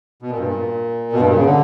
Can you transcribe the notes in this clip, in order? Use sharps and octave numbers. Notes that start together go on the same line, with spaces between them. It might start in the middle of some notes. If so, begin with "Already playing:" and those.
B2
A#2
G2
A#2
B2
G2
A#2
C#3
D3